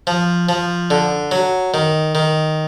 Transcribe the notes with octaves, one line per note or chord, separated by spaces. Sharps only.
F3
F3
D3
F#3
D#3
D#3